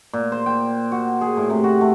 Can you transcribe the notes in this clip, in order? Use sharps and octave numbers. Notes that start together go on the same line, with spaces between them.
A#2
C5
G5
F#4
G#4
A2
C3
F#4
A3